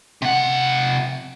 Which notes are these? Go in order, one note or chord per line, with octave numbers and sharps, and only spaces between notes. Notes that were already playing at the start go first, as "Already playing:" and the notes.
C3 F#5